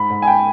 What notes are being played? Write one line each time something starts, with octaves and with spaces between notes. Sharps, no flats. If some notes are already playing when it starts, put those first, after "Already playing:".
Already playing: G#2 B5
G#2
G#5
G5